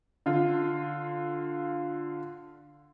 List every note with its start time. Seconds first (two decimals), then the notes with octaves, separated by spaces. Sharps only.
0.26 D3 F4